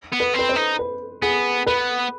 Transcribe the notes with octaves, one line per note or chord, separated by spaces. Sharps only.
B3
B4
C4 B4
C5
D#4
B4
B3 G#4
B3 B4